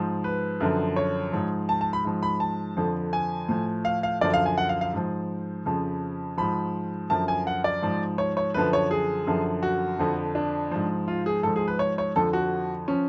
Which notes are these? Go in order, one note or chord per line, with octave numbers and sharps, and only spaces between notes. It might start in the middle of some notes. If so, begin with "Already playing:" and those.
Already playing: G#2 F3
B4
F#2 D3 F3
C#5
G#2 F3
A5
A5
B5
G#2 F3
B5
A5
F2 D3 F3
G#5
A2 F3
F5
F5
F#2 D3 F3 D5
F5
G#5
F#5
F5
F5
G#2 F3
F2 C#3 F3
G#2 F3 B5
F#2 D3 F3 A5
G#5
F#5
D5
G#2 F3
C#5
C#5
F#2 D3 F3 B4
C#5
G#4
F#2 D3 F3
F#4
F2 D3 F3
D4
G#2 F3
F4
G#4
G#2 F3 A4
G#4
B4
C#5
C#5
F2 D3 F3 A4
F#4
F3 C#4